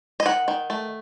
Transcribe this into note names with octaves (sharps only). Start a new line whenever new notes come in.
D#5
D#3 F#5
D#3
A3